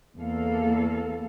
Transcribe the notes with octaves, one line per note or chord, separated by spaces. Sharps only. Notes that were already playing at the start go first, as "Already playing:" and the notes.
E2 A#3 A4 F5